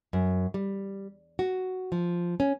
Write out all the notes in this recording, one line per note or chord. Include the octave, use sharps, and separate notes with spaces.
F#2
G3
F#4
F3
C#4